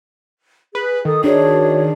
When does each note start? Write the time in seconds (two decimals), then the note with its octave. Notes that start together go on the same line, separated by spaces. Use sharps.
0.75 G#4 B4
1.05 D#3 A4 D#6
1.24 D4 F#4 G#4 C#5